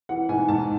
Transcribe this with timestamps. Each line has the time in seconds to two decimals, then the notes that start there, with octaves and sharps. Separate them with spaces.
0.09 E3 F#5
0.29 G#2 G#5
0.48 G#2 A5